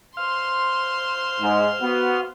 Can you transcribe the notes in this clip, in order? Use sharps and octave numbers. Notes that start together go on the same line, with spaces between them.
C5 F5 C6
G#2
B3 F#4